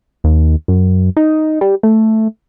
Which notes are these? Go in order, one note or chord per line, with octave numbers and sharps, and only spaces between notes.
D#2
F#2
D#4
G3
A3